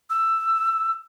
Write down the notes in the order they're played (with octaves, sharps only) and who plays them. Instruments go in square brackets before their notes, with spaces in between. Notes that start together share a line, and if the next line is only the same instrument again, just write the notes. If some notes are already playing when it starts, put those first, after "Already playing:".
[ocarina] E6